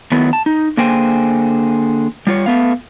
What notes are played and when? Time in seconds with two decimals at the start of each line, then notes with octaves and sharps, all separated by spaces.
0.12 D#3 F#3 A3 B3 E4
0.33 A5
0.46 D#4
0.77 D3 A#3 G#4 C5 G5 G#5
2.27 G3 F4 C#5
2.46 A3 B3 F5